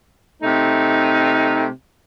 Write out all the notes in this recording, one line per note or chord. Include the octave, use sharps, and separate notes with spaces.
C3 A3 D#4